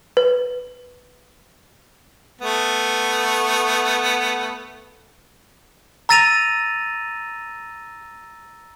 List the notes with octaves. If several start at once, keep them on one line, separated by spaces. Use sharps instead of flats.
B4
A3 B3
A#5 E6 A6 A#6 D#7 F7